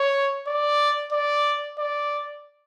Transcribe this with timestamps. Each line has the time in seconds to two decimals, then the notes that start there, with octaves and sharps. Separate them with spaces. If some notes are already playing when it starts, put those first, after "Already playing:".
Already playing: C#5
0.47 D5
1.12 D5
1.79 D5